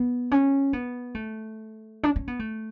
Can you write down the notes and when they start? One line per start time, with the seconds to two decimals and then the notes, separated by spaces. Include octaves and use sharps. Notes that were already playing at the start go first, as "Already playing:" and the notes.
Already playing: B3
0.31 C#4
0.73 B3
1.15 A3
2.03 D4
2.16 C#4
2.27 B3
2.39 A3